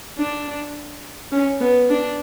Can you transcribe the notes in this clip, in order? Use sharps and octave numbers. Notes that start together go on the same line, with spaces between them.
D4
C#4
B3
D4